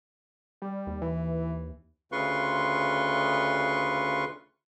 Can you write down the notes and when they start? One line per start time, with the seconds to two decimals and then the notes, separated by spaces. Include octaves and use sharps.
0.62 G3
0.87 D#2
1.02 E3
2.12 D2 C#3 F4 B4 C6 C#6